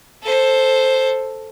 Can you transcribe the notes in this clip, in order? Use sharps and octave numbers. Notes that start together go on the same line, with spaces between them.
A4 C5